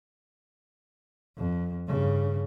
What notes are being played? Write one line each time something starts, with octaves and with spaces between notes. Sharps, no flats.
F2
G2 C#3